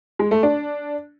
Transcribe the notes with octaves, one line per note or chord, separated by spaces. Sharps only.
G#3
A3
D4